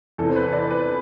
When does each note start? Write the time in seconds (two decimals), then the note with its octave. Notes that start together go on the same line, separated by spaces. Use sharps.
0.18 E2 C3 E3 A4
0.30 C5
0.36 B4
0.53 D5
0.71 B4